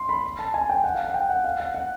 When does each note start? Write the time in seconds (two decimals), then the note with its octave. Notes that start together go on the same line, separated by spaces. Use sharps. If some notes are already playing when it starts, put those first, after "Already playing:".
Already playing: C6
0.09 B5
0.39 A5
0.54 G#5
0.69 G5
0.84 F#5
0.94 F5
1.05 F#5
1.14 G5
1.29 F#5
1.44 F5
1.60 F#5
1.74 F#5